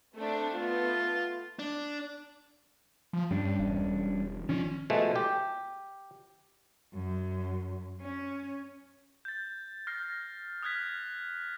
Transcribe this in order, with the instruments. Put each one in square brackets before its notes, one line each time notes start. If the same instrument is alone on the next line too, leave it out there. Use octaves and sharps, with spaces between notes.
[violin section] A3 C4 D4
[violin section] A3 B3 [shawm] F4
[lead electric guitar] D4
[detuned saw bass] F3
[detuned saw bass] G2 [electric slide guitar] G3 C#4 D4
[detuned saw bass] E1
[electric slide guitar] D#3 F3 D4 [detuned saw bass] C#4
[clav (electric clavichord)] B2 F3 G#3 A3
G4
[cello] F#2
C#4
[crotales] G6 A6
F6 G6 A6 A#6 C7
D#6 F6 F#6 G#6 B6